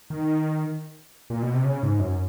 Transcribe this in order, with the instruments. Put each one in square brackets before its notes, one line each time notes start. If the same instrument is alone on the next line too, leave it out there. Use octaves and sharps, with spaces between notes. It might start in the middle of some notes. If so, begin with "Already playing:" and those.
[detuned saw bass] D#3
A#2
B2
C3
C#3
G#2
F#2